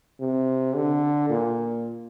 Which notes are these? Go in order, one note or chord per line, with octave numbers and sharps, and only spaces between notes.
C3
D3
A#2